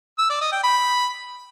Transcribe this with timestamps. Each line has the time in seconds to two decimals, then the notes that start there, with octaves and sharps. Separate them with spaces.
0.19 E6
0.30 D5
0.41 D#5
0.52 G5
0.63 B5